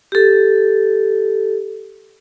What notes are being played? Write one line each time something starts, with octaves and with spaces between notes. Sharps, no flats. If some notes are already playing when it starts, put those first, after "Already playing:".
G4 A4